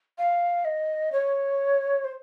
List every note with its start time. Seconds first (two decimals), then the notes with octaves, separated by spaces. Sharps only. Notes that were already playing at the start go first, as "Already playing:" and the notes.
0.18 F5
0.65 D#5
1.12 C#5
2.04 C5